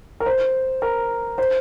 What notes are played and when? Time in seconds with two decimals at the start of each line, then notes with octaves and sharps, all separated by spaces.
0.20 A#4
0.26 C5
0.82 A#4
1.38 C5